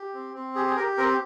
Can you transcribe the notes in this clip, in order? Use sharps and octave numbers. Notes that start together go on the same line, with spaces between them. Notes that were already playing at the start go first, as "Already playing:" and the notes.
Already playing: G4
C4
C4
G4 G#4
G#4
G4 A#4
C4 A#4